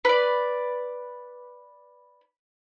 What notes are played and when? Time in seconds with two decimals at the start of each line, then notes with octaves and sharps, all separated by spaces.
0.05 B4 D5